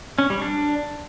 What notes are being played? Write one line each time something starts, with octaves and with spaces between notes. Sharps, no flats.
C#4
G3
D4